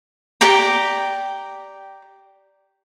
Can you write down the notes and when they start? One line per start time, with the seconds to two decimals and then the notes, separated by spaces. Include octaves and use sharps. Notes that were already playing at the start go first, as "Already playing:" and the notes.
0.41 G4 D5 G5 A#5